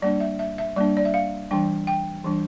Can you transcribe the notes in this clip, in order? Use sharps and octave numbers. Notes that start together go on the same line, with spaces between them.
G3 A#3 D4 D5
E5
E5
E5
G3 A#3 D4 D5
D5
E5
F5
E3 G3 D4 G5
G5
E3 G3 D4